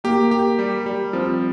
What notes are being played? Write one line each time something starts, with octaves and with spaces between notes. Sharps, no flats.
A#3 G4
G4
G3
G3
F3 C4